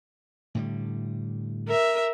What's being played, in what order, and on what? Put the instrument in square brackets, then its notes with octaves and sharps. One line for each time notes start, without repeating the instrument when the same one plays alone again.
[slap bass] A2 D3 G3
[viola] A#4 E5